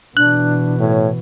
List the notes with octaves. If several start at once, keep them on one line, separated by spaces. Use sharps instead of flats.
B2 E3 D4 F#6
A2 C#5